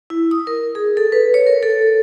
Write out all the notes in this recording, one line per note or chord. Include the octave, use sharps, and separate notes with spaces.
E4
D#6
A#4
G#4
A4
B4
C#5
A#4
A4